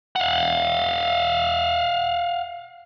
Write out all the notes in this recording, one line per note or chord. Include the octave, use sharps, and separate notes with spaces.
F5 F#5